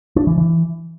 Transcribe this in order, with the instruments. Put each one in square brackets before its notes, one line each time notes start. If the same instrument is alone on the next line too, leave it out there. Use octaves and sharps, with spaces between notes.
[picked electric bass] D4
E3
E3